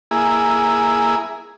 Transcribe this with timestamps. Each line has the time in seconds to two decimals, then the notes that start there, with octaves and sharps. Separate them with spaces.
0.11 A#3 E4 G#4